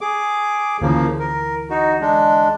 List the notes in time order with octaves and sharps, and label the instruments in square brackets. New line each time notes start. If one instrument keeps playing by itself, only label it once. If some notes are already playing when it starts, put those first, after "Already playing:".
[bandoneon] G#4 D6
[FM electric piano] D2 E3 [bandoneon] C#3 F3 A#3
[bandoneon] A#4
D#4 F#4
G#3 D4